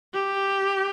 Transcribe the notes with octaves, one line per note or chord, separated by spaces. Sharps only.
G4